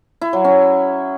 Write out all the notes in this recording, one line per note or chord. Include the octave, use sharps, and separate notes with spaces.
E4
F#3
C#4